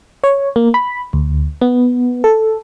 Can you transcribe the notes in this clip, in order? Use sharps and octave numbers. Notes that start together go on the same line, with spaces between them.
C#5
A#3
B5
D2
B3
A4